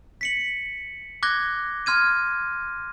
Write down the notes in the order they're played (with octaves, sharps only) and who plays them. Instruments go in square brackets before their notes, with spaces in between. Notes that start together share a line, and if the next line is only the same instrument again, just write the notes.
[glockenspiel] B6 C#7 F#7
D6 F#6 G#6 A#6 G7
C6 F6 G#6 D#7